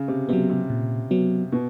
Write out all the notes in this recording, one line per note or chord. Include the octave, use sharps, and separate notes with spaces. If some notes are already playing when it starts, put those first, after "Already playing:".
Already playing: C#3
C3
C3 F#3 B3
C3
A#2
F#3 B3
B2